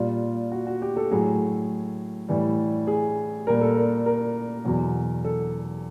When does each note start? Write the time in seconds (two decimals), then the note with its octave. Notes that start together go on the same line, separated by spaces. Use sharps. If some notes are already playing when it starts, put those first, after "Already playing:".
Already playing: A#2 G3 F4
0.52 F#4
0.67 F#4
0.82 G4
0.96 A4
1.11 A2 F#3 G#4
2.28 A2 E3 G3
2.87 G#4
3.47 A#2 G3 A#4
3.61 A4
3.77 A#4
4.06 A#4
4.65 E2 B2 F#3
5.24 A4